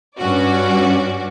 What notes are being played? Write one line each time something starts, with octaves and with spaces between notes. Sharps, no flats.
G2 C#4 F#4 D5